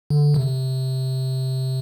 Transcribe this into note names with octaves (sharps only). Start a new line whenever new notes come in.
D3
C3